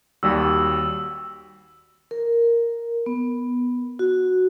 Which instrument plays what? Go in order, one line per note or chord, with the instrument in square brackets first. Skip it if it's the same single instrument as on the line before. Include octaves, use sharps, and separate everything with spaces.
[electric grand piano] D#2 G3 F#4 [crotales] E6
[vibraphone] A#4
B3
F#4